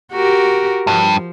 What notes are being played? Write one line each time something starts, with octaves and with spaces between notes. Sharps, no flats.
F#4 G4 A#4
G2 F3